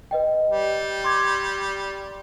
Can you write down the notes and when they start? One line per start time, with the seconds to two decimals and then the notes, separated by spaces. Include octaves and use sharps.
0.11 B4 D#5 G5
0.50 G3
1.04 C6 D6 G#6